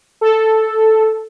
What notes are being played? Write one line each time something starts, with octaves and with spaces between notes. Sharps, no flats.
A4